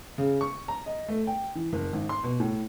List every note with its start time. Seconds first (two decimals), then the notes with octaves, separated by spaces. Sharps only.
0.18 C#3
0.41 C#6
0.68 A#5
0.86 D#5
1.09 A3
1.27 G5
1.55 E3
1.73 F#1
1.93 G#1
2.09 C6
2.23 B2
2.40 A2